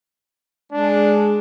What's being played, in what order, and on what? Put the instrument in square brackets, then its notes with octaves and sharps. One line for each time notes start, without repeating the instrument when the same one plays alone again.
[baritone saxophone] G#3 [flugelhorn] D4